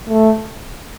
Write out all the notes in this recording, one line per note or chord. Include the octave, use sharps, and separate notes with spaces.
A3